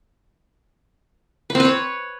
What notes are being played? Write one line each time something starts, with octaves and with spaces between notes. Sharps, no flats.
B4
C4
B4
C#5